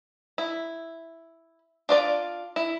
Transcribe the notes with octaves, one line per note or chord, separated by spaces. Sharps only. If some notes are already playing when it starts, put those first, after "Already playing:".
E4
D4 F4 D5
E4